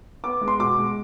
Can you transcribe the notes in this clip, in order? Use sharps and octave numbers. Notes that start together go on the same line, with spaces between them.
B3 D6
G#3
C6
B2 D6
G#3